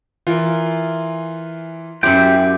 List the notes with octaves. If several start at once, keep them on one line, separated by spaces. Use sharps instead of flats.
E3 F4 A#4
F#2 E4 G4 C5 G5 C#7